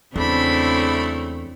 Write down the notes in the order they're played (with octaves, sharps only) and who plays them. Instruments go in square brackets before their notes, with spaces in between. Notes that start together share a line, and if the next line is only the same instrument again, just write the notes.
[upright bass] E2 [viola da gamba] C#3 C4 E4 [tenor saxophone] A3 [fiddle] D4 B5